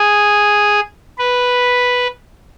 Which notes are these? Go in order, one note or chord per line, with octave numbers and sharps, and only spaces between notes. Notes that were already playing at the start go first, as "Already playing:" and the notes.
Already playing: G#4
B4